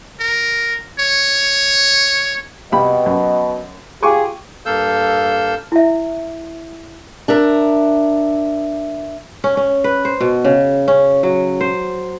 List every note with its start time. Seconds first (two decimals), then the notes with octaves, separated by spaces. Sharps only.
0.20 A#4
0.99 C#5
2.72 C2 B2 G3 B5
3.06 F#2
4.03 F4 G4 G#4 G#5 C#6 D6
4.66 G2 A#3 A4 F5 E6 G6
5.72 E4 E5
7.28 D4 A#4 E5 A#5
9.44 C#4
9.57 C#4
9.84 B4
10.05 C5
10.21 B2
10.44 C#3
10.88 C#4
11.23 F#3
11.61 C5